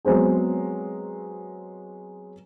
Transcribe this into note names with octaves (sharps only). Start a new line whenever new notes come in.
F#3 G#3 B3 C4 G#4